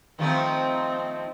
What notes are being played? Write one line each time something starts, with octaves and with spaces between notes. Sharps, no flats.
D#3 F3 A3 C4